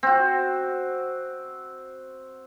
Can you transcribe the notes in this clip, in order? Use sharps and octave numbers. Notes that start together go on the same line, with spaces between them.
C4 F#4